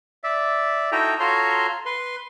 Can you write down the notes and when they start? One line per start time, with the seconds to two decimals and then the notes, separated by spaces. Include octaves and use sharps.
0.24 D5 E5
0.92 D#4 E4 F#4 A4 G5 A#5
1.20 F4 F#4 A4 C#5 A#5 C6
1.86 B4 C6